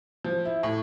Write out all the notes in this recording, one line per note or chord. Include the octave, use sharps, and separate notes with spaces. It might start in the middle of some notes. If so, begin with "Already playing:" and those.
F3
E4
A2